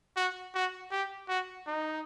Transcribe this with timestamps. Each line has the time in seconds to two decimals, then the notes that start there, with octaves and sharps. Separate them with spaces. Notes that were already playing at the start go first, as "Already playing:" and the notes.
0.17 F#4
0.55 F#4
0.91 G4
1.29 F#4
1.67 D#4